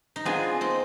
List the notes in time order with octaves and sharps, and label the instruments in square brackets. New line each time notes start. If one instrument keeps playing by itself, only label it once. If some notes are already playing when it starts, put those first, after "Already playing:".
[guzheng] D#4
[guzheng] B3 D4 [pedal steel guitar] C4 F4 G#4
[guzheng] C4 D#4